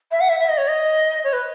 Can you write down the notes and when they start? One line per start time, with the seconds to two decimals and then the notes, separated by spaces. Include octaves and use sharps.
0.12 E5
0.21 F#5
0.29 E5
0.40 E5
0.49 D#5
0.58 C#5
0.68 D#5
1.24 C#5
1.33 B4